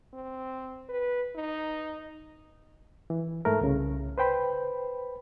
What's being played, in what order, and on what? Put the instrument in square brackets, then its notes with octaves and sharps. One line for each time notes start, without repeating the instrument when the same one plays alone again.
[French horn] C4
B4
D#4
[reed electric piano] E3
G#2 A3 A#4
C2 C#3
B4 C5 G5 B5